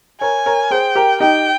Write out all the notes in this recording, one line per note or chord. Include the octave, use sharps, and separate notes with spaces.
A#4 C#5 G#5
A#4 C#5
G#4 C5 G5
G4 A#4
D#4 G4 G5